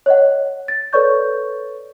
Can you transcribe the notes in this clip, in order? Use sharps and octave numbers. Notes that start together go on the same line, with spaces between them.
C#5 D#5 F#5
A6
A4 B4 C#5 D5 C#6 G6